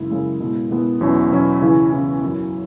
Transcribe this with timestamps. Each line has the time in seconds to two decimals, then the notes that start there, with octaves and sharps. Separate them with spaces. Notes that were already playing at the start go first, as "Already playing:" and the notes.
Already playing: F#2 C#3 G#3 E4
0.10 F#2 C#3 G#3 E4
0.40 B2 G#3 B3 E4
0.70 B2 G#3 B3 E4
1.01 E2 B2 F#3 C#4 E4
1.31 E2 B2 F#3 C#4 E4
1.61 C#3 E3 C#4 E4
1.92 C#3 E3 C#4 E4
2.22 F#2 F#3 E4